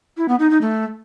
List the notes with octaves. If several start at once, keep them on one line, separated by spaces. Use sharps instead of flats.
E4
B3
D#4
D#4
A3